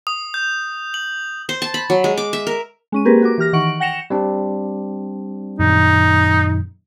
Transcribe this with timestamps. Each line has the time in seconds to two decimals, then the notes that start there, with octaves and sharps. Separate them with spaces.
0.07 D#6
0.34 G6
0.94 F#7
1.49 C5
1.62 A5
1.74 B5
1.90 F#3
2.04 G#3
2.18 D6
2.33 E5
2.47 A#4
2.92 G#3 C#4 D#7
3.05 A#3 C4 G4 G#4 A#4 B4
3.22 F#4 A#4 D6
3.38 E3 G4 F6 A#6
3.53 D#3 E3 F#5 C#6 D7 F#7
3.80 F#5 G5 A#6 C#7 E7 F7
4.10 G3 C4 D4
5.59 F#2 A#2 D#3 D#4